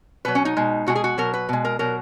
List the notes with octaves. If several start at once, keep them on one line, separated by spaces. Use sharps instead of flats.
B2 F#3 B4
C#4
D#4
B2 G#3
B2 G#3 F#4
G#4
F#4
B2 F#3 A#4
B4
B2 G#3
A#4
B2 F#3 A#4